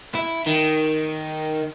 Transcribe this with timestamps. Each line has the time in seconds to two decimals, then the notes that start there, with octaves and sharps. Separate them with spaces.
0.15 E4
0.47 D#3